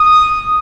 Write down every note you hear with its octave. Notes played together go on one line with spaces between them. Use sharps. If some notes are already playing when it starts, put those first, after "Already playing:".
Already playing: D#6